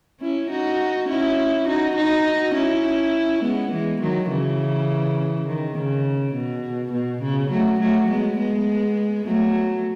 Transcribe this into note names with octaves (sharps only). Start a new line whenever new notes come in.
C#4 E4
D#4 F#4
C#4 E4
D#4 F#4
D#4 F#4
C#4 E4
G#3 B3
E3 G#3
D#3 F#3
C#3 E3
D#3
C#3
B2
B2
C#3
F#3 A3
F#3 A3
G#3 B3
G#3 B3
F#3 A3